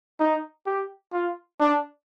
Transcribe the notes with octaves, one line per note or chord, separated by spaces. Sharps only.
D#4
G4
F4
D4